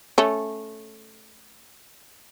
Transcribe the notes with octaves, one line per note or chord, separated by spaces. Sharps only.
A3 C#4